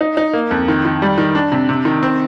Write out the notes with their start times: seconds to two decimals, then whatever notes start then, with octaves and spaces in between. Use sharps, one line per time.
0.01 D#4
0.17 D#4
0.33 A#3
0.51 F2
0.68 D#3
0.85 D#3
1.02 G3
1.18 D#3
1.35 D4
1.52 C3
1.69 C3
1.85 D#3
2.03 C4